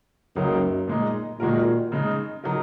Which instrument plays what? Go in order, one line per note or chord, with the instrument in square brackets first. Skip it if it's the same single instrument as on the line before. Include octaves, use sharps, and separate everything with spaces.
[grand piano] C#2 C#3 F#3 A#3 D#4 [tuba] F#2
[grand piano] A#2 G#3 D#4
[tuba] A#2 [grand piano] D#3 G#3 F#4 A#4
[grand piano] C#3 G#3 D#4
C#3 F#3 D#4 A#4